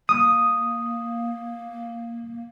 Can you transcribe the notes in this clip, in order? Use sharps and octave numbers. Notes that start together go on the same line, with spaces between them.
A#3 D#6